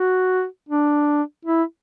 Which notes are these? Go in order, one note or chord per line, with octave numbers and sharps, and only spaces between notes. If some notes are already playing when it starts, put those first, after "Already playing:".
Already playing: F#4
D4
E4